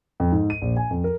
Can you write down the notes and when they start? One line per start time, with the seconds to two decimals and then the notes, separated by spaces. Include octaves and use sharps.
0.20 F2
0.32 G#2
0.50 D#7
0.62 A#1
0.77 G#5
0.91 F2
1.04 A#4